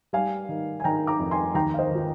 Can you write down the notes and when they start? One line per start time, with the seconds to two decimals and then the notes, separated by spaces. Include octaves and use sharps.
0.13 G3 F5 G#5
0.49 D#3
0.80 G#5
0.84 D#3 G5 A#5
1.07 A#5 D6
1.19 F2
1.31 G#5 C6
1.55 D#2 G5 A#5
1.74 F5
1.79 C5 D#5
1.91 D#3 F4